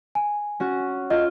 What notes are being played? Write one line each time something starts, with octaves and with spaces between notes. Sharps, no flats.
G#5
C#4 F#4
F4 D#5